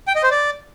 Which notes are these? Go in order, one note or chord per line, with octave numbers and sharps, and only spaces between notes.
G5
D#5
C5
D5